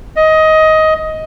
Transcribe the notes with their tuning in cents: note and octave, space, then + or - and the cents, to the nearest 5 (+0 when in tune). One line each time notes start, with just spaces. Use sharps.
D#5 +15